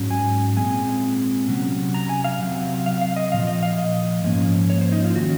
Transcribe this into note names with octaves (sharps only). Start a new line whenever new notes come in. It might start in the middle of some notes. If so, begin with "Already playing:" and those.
Already playing: G#2 F#3 C#4
G#5
A#2 G#3 C4 G#5
C3 F#3 C#4
A#5
G#5
F5
C3 F#3 C4
F5
F5
D#5
A#2 F3 F5
D#5
F5
D#5
G#2 F3 A#3 C#4
C#5
C5
D#4
F4
D#3 G#3 C#4 F#4